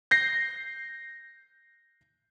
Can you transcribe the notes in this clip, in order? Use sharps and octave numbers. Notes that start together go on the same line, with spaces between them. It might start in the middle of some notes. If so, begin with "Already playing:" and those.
G6 A#6 C7